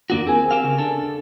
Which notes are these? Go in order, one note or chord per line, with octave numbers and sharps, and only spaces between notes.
F2 D#3 A#3 D4 F4 F#4
C4 G#4 A#4 G#5
C4 G4 F5
C#3
D4 A4